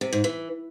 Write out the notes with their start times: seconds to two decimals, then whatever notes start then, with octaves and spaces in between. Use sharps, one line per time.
0.01 C3
0.13 G#2
0.24 E3